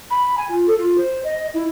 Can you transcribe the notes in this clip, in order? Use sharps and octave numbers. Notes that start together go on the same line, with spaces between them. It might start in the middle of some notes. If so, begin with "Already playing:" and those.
B5
G#5
F4
A4
F4
C5
D#5
E4